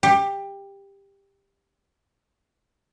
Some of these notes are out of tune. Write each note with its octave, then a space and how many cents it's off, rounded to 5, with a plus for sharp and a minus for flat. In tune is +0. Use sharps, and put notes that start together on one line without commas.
G4 +15